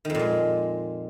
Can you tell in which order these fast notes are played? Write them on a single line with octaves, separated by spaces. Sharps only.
D#3 F2 A#2 G#3